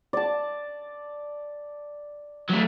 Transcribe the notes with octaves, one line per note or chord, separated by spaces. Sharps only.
D5 A5
F#3 A3